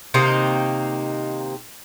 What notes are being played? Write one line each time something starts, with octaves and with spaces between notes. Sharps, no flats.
C3 D#3 A#3 D#4